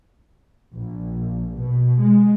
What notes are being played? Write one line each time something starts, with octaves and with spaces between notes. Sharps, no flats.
A#1
B2
G#3